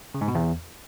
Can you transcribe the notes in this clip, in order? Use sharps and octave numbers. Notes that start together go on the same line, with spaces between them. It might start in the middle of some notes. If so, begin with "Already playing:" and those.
C#3
G#2
B2
E2